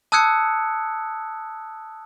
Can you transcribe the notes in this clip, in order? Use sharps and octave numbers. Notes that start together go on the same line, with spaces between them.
A5 D#6 E6 F#6 G#6 C#7